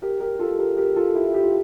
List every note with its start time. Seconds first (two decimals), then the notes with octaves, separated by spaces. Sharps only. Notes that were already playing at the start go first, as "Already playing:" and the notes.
0.02 G4 A#4
0.20 G4 A#4
0.39 F4 A4
0.59 G4 A#4
0.77 G4 A#4
0.96 F4 A4
1.15 E4 G4
1.34 G4
1.43 F4